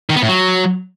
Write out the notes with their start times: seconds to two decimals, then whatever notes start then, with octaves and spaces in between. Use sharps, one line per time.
0.10 D#3
0.16 B3
0.22 A2
0.28 F#3